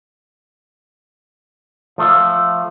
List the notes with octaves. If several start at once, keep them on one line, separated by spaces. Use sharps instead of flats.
F3 A3